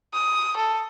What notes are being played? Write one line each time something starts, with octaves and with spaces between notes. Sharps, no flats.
D#6
A4